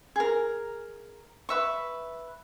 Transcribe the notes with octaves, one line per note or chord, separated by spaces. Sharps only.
G#4 A#4
B4 E5 C#6